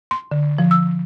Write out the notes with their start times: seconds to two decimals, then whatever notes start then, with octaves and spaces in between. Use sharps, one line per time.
0.11 C6
0.31 D3
0.58 F3
0.71 E6